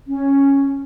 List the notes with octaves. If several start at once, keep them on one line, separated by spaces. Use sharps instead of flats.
C#4